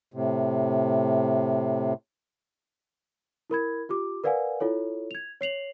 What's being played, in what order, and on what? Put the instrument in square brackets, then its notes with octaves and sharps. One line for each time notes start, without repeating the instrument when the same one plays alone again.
[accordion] A2 C3
[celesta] E4 A#4 B5 G#6
F4 G4 D6
A#4 B4 D5 F5 F#5 G#5
E4 F4 A4 C#5
G#6 F7
C#5 C7 F7 F#7